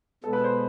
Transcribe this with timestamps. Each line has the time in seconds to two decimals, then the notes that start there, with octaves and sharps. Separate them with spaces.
0.24 B2 G#3 B3 A4
0.33 B4
0.44 C5